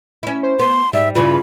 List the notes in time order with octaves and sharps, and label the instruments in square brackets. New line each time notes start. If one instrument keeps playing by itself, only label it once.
[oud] C#4 E4
[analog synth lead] C5
[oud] B3 [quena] C6
[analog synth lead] G#2 [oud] G3 [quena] E5
[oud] G2 C#3 E3 [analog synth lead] F4 [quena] B5